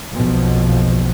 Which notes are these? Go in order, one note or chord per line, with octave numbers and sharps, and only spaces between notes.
F#1 B1 B2 F3